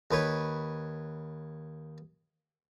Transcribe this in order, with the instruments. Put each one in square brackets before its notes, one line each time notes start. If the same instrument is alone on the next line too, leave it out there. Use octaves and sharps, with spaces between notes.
[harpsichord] D#2 B4 C#5